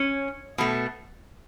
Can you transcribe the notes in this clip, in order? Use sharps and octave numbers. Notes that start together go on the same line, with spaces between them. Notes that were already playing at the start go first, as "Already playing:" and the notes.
Already playing: C#4
B2 A3